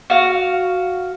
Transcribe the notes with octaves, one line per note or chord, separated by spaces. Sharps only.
F#4 F5